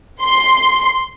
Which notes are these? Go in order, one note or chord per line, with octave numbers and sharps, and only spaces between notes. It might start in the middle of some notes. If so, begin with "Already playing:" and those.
C6